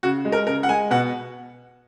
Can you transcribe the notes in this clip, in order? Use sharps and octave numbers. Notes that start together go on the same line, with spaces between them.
C#3 F#4
G#3
A#4
C#3 A#4
F#5
G#3 G#5
B2 F#5